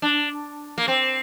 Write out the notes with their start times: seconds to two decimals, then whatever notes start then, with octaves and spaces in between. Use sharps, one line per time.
0.02 D4
0.78 A#3
0.88 C4